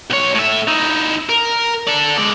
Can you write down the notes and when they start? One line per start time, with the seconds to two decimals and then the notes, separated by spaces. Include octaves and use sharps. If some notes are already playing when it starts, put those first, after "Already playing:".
0.10 B1 C#5
0.35 A2 E5
0.67 D#4 E4
1.29 A#4
1.87 A4 D5
2.17 G#3 D5